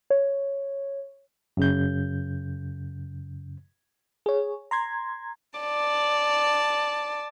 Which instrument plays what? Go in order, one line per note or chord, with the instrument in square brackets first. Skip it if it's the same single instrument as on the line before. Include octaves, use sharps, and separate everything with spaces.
[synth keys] C#5
[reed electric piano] F#2 C#3 G6
[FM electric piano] G#4 C#5
A#5 C6 G#6
[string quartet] D5 A5